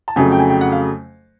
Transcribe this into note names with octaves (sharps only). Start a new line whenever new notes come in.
A5
F2 C#3 F#3 A3 G#5
G5
G#5
G5
F#5
F5